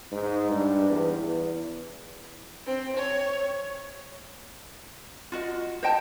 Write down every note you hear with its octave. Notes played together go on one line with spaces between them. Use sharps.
G#2
G2
E2
E2
C4
C#5
F4 F#4 D#5
C5 D#5 G5 A5